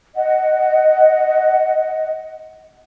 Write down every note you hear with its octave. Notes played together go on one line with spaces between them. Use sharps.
D#5 F#5